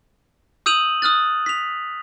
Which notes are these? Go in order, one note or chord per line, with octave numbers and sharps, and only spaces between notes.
D#6 E6 G6 D#7 F7 F#7
D#6 F6 F#6 A6
B6 F7